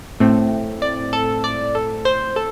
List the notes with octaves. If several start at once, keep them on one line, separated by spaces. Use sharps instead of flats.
A2 A3 C4
D5
A4
D5
A4
C5
A4